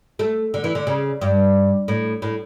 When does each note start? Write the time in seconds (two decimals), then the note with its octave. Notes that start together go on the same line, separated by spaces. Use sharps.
0.19 A3
0.54 D3
0.64 E3
0.75 D3
0.87 C#3
1.21 G2
1.88 A2
2.22 A2